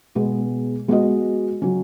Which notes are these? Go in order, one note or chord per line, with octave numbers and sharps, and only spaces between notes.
B2 G#3 B3 G#4
G#3 B3 F#4 D#5
C#3 F#3 C#4